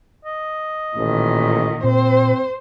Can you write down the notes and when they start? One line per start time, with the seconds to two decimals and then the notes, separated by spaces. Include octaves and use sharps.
0.25 D#5
0.97 A1 A#2 D#3
1.84 A#2 C4 C5